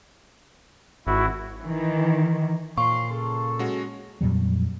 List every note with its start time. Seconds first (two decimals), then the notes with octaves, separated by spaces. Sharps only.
1.07 G#1 E4 F#4
1.62 D#3 E3
2.77 A#2 F3 C#5 F5 C6 C#6
3.10 C#3 A4
3.59 G#3 C#4 F#4
4.21 F2 A#2 F#3 G3